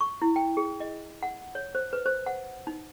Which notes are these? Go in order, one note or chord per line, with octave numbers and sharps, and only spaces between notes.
C#6
E4
G5
G#4
D#5
F#5
C#5
C5
B4
C5
F#5
D#4